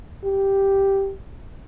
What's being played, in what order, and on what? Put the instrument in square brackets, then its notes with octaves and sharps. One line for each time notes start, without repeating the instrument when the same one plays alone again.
[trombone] G4